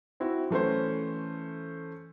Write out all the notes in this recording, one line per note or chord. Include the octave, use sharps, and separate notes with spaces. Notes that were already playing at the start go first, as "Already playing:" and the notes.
C4 E4 F#4
E3 A3 C#4 C5